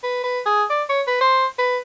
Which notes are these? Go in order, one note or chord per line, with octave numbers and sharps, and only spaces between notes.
B4
B4
G#4
D5
C#5
B4
C5
B4